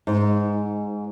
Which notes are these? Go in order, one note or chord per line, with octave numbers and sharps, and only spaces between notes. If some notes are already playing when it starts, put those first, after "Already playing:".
G#2